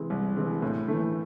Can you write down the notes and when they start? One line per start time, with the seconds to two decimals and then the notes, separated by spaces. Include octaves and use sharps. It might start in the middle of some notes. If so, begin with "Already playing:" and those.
Already playing: C3 E3 G#3 C4
0.10 C2
0.37 C3 E3 G#3 C4
0.62 A2
0.88 E3 A3